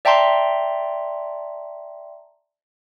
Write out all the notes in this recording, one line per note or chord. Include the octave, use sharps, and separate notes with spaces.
D5 E5 G5 A5 A#5 C6